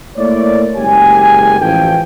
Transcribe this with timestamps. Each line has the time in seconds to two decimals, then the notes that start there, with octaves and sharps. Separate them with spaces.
0.16 A3 A#3 E4 C#5 D5
0.76 F#1 G#3 G4 G#5
1.60 A1 F3 G5